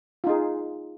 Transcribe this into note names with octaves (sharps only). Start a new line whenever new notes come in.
D#4 F4 G#4